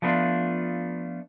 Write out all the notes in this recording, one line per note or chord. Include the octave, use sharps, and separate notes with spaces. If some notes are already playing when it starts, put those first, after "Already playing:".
F3 A3 B3 D4 F4